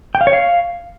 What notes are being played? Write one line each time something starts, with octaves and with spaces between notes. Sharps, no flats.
G5
F5
C#5
F5